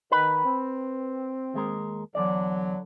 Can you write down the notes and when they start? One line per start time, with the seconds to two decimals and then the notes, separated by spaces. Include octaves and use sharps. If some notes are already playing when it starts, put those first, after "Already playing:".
0.12 D#3 B4 B5
0.44 C4
1.54 D#2 G#3 A#4
2.15 E2 D3 F#3 D5